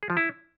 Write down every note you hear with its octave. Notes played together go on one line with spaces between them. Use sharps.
G#4
F3
E4